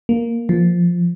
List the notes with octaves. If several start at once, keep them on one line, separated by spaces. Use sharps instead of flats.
A#3
F3